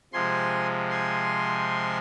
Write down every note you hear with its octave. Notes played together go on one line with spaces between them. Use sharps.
C3 F3 G#3 G#5 C6
G#5 C6